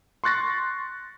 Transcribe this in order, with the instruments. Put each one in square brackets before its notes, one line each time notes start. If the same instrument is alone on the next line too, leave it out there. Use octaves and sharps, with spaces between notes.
[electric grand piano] C6 C#6 F#6 A6 A#6